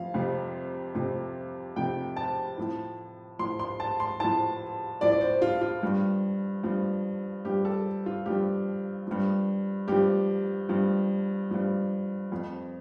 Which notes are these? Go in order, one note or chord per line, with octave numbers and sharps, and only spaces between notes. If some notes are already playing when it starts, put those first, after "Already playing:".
Already playing: F2 F3 F5
F2 C3 F3
F2 C3 F3
F2 C3 F3 G5
A5
A2 F3
A2 F3 C6
C6
A5
C6
A2 F3 A5
A2 F3 D5
D5
C5
F4
F4
G2 F3
G2 F3
G2 F3 G4
A4
F4
G2 F3 G4
G2 F3
G2 F3 G4
G2 F3
G2 F3
F2 F3